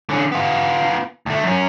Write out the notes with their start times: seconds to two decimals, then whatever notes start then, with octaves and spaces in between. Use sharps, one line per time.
0.10 D3 C#4
0.32 B3 F4
1.26 D2 A3
1.43 F#2 C#4